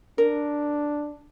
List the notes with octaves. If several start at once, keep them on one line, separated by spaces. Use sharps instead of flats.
D4 A#4